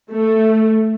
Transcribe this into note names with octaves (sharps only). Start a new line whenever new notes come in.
A3